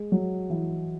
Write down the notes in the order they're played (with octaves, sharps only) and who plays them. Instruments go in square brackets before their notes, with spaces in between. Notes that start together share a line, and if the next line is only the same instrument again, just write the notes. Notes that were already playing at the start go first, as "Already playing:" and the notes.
Already playing: [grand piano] G#3
F#3
E3